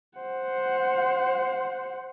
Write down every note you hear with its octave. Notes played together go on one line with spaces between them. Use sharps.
C5 F#5